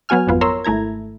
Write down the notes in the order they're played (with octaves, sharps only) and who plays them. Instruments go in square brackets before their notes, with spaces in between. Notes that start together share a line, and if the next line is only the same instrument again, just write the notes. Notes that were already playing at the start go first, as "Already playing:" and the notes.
[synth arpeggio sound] F#3 B3 F#4 G#5 F6
G#1 F2 B3 F4
A#4 C#5 A#5 C6 E6
G#1 A3 E4 A#5 G#6